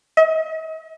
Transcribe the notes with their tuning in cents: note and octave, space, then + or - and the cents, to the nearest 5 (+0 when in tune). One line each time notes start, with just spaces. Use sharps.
D#5 +45